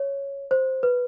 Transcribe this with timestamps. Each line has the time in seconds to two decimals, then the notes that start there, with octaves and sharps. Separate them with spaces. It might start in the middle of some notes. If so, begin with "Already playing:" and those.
Already playing: C#5
0.51 C5
0.83 B4